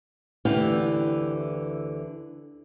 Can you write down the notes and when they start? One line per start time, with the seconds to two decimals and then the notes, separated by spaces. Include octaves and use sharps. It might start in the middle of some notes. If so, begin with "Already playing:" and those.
0.45 D2 D3 E3 E4 G4 F5